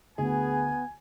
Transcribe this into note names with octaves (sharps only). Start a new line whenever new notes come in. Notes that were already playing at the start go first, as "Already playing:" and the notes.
D2 B3 G#4 G#5